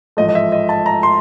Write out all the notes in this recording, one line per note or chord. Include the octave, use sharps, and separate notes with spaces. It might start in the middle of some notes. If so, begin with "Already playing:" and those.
A1 G#2 F3 A3 D#5
D#5
E5
D#5
A5
A#5
C6